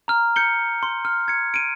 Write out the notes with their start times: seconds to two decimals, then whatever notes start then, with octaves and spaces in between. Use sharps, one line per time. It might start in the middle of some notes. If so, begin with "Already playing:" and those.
0.08 A#5 F6
0.36 G6 C#7 G7
0.83 C6
1.05 F6
1.28 G#6 C#7
1.54 D7 D#7